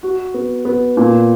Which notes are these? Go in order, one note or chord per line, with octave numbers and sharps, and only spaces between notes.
F#4
B3
B3
A#2